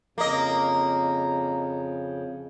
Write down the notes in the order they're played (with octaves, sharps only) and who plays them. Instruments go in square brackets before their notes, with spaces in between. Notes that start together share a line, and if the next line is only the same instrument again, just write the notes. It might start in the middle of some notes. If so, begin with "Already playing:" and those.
[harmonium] F2 C#3 [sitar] A#3 D#5